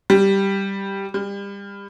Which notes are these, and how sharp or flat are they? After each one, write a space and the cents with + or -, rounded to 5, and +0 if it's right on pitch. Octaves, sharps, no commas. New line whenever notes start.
G3 +0
G3 +30